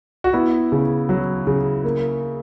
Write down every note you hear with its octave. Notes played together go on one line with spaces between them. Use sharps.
F#4
B3 E4
C#3
F#3
C#3
A#3